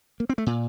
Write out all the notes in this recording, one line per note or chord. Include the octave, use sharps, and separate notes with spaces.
A#3
C4
A3
A#2